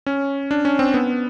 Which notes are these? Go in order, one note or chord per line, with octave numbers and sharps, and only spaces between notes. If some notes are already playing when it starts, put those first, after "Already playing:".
C#4
D4
C#4
C4
B3